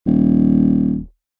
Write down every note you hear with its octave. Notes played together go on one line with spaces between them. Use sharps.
D#1